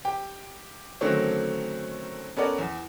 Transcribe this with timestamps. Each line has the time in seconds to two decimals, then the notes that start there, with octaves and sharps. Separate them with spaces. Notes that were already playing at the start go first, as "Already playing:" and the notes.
0.05 G4 G5
1.01 D3 D#3 F#3 A3 C4 C#4
2.37 B3 C#4 A4 A#4 D5 F#5
2.59 E2